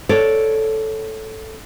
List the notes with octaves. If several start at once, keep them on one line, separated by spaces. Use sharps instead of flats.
A4 C#5 D5